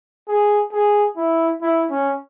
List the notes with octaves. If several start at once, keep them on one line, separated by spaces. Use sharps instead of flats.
G#4
G#4
E4
E4
C#4